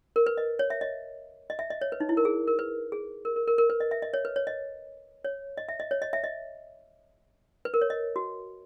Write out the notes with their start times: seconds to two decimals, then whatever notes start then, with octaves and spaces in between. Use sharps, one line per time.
0.16 A#4
0.26 B4
0.37 D#5
0.59 C#5
0.70 E5
0.81 D#5
1.50 D#5
1.59 E5
1.70 D#5
1.81 C#5
1.92 B4
2.00 D#4
2.09 E4
2.17 A#4
2.25 G#4
2.48 A#4
2.59 B4
2.92 G#4
3.25 A#4
3.36 A#4
3.48 A#4
3.58 A#4
3.70 B4
3.80 D#5
3.91 E5
4.02 D#5
4.14 C#5
4.25 B4
4.36 C#5
4.47 D#5
5.25 C#5
5.57 D#5
5.69 E5
5.80 D#5
5.91 C#5
6.02 D#5
6.13 E5
6.24 D#5
7.65 B4
7.74 A#4
7.81 C#5
7.90 D#5
8.16 F#4